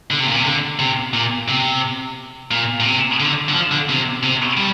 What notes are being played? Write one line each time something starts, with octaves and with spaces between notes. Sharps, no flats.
D3
C3
A#2
C3
D3
C3
A#2
C3
A#2
A#2
C3
D3
D3
F3
D3
C3
C3
G3